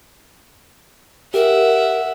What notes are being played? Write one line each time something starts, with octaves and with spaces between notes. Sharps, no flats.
G4 A#4 E5 F#5